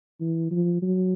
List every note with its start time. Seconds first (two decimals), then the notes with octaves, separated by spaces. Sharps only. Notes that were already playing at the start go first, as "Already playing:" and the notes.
0.20 E3
0.51 F3
0.82 F#3